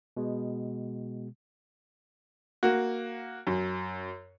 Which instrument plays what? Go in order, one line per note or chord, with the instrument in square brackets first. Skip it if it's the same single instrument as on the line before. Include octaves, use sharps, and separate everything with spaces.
[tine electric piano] B2 G#3
[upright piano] A#3 F#4
F#2